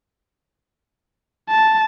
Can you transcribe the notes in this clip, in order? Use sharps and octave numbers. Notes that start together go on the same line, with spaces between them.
A5